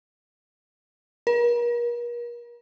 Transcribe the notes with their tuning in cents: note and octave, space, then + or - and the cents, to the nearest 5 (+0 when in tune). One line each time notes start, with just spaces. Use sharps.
A#4 +40